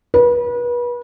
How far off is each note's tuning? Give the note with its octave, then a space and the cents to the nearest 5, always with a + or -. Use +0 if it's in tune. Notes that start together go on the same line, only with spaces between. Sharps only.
B4 -30